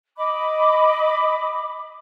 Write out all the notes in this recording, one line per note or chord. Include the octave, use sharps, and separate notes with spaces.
D#5 B5 D6